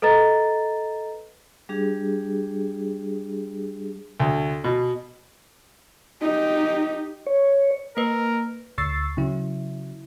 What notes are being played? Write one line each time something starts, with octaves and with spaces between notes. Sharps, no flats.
A4 B4 D#5 A#5 A6
G3 D4 G4 G#4
D2
B2
D#4 G4
C#5
A#3 A#4 B4
D2 C#6 E6 A6 C7
C#3 F#3 E4